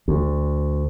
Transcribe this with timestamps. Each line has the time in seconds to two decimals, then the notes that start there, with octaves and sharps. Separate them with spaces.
0.08 D2